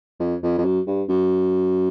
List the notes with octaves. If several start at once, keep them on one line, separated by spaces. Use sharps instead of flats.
F2
F2
F2
F#2
G2
F#2